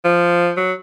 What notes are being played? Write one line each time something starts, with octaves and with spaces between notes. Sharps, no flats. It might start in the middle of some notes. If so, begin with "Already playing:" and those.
F3
F#3